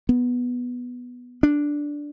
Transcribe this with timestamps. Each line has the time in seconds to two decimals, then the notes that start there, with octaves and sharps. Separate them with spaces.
0.09 B3
1.43 D4